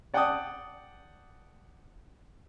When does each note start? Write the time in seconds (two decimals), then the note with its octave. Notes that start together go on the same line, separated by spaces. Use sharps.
0.14 D5 F#5 G5 A5 D6 D#6